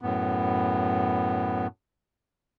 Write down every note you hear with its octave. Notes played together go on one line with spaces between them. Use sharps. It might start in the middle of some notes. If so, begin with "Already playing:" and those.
F#2 A2 B3